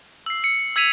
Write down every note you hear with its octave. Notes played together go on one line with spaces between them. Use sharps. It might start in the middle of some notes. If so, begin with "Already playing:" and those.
E6 C7
C#7
E6 G#6 B6 D#7 F7